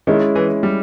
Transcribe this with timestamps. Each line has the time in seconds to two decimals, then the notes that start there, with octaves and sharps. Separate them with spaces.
0.07 D#3 G#3 C#4 E4
0.36 E3
0.63 G3